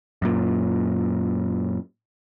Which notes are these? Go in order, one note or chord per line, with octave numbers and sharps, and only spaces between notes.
F#2 A#2